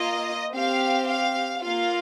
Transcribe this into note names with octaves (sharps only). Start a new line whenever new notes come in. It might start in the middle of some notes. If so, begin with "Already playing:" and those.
Already playing: A#3 F4 D#5
C4 G4 F5
F5
A#3 F4 F5